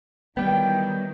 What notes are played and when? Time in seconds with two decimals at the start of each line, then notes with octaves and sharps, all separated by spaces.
0.37 D#3 E3 F#3 G3 B3 G5